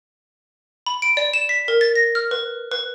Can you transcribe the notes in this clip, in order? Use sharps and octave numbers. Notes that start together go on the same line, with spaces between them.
B5
D7
D5
E7
B6
A#4
A6
A#6
F6
B4
B4